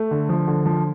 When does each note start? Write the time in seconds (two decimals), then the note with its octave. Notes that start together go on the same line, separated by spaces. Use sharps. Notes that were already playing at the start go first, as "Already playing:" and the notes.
Already playing: A3
0.11 D3
0.29 F3
0.48 D3
0.66 F3